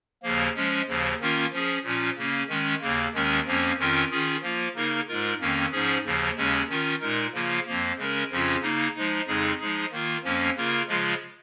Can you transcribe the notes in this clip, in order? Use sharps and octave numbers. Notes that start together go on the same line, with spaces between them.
D#2 C#3 F3 A#3
F3 G#3 C#4
D#2 C#3 F3
D#3 A#3 C#4 F4 A#4
F3 C#4 G#4
A#2 F3 C#4 F4
C#3 A#3 C#4
D#3 G#3 C#4
D#2 C#3 A#3
D#2 D#3 G#3 C#4 A#4
F2 F3 A#3 C#4
F2 D#3 C#4 F4 A#4
D#3 C#4 F4 G#4
F3 A#3 F4
C#3 A#3 D#4 A#4
G#2 G#3 F4 A#4
F2 D#3 A#3 C#4
G#2 F3 C#4 G#4
D#2 C#3 F3
D#2 C#3 G#3 C#4
D#3 C#4 F4 A#4
A#2 G#3 D#4 A#4
C#3 F3 A#3 F4
F2 F3 A#3
C#3 G#3 C#4 A#4
F2 C#3 F3 C#4 F4
C#3 A#3 D#4
F3 G#3 D#4
F2 C#3 G#3 D#4 G#4
F3 G#3 D#4 G#4
D#3 A#3 F4 A#4
F2 F3 A#3 C#4
C#3 A#3 F4 A#4
C#3 F3 G#3 F4